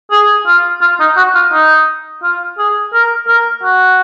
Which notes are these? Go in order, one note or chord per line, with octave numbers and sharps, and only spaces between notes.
G#4
F4
F4
D#4
F#4
F4
D#4
F4
G#4
A#4
A#4
F#4